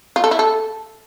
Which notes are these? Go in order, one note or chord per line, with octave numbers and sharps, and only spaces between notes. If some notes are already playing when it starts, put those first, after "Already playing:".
F4
A4
E4
A4